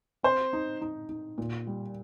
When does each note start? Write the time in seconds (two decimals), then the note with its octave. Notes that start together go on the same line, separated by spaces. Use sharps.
0.23 C4 C5
0.53 D#4
0.81 D#4
1.09 D#4
1.38 A#2
1.67 G3